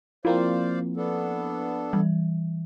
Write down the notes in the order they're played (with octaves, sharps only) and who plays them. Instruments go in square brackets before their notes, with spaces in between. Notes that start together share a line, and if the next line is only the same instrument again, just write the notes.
[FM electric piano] F3 A#3 C4 [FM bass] E4 [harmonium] C5 D5 F5
[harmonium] B3 D4 A4
[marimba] E3 [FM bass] G3